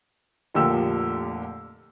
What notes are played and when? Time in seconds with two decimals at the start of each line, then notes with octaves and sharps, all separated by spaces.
0.55 F1 A#2 D3 F3 G4 E6